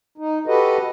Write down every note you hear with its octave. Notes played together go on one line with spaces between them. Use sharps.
D#4
F#4 G4 A4 B4 D#5